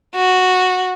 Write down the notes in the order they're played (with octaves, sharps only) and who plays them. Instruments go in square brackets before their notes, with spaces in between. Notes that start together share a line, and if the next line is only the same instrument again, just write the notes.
[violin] F#4